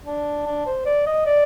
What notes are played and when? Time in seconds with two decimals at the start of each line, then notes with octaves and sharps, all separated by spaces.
0.06 D4
0.47 D4
0.66 C5
0.86 D5
1.07 D#5
1.26 D5